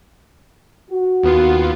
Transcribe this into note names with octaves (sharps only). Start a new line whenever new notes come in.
F#4
D#2 B3 F4